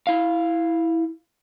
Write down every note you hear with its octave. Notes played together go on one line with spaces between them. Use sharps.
E4 F5